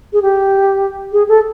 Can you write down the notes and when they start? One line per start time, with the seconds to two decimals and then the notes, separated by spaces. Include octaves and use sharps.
0.13 G#4
0.22 G4
1.13 G#4
1.29 A4